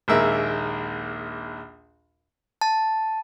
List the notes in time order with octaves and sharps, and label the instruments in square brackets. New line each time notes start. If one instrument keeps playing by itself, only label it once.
[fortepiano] A#1 D#2 G#3 A#4 E5
[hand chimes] A5